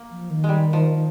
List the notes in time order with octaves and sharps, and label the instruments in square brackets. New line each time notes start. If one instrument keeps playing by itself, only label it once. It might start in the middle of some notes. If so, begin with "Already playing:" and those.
Already playing: [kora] A#3
[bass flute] F3
D#3
[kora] G#3
G3
F3